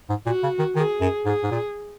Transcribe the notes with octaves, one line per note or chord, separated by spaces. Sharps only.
G#2
A#2 F#4
C#3
D#3
D#3 G#4
F#2
G#2 G#4
G#2
A#2